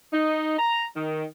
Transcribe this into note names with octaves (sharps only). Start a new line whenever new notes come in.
D#4
A#5
D#3